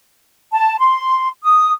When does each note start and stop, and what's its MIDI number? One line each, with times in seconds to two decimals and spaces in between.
0.53 0.79 81
0.79 1.29 84
1.44 1.72 87